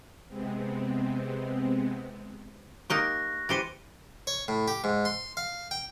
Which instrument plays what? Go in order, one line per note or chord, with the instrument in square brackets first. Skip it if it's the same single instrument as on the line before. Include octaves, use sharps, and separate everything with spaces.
[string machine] C3 G#3 B3 C4
[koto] A#3 D#4 G4 [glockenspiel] C#6 F#6 A#6
[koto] E3 G4 C5 [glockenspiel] A6 C#7 D#7
[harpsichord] C#5
A2
G4
G#2
C6
F5
G5